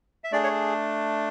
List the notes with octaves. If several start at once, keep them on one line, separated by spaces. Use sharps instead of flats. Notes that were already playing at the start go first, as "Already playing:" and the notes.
E5
A3 D4 G#4 D5
C#5